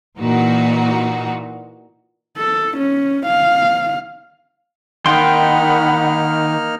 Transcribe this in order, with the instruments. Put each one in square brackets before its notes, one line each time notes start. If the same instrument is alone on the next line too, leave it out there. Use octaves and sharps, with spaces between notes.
[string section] A#2 E3 D#4 F#4
[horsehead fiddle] A4
C#4
F5
[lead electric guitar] D#3 [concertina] A#3 D#4 F6 [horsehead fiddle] F#5 B5 [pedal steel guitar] G5 C6